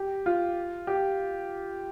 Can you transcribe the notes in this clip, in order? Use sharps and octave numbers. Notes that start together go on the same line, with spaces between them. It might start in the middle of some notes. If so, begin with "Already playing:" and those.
Already playing: G4
F4
G4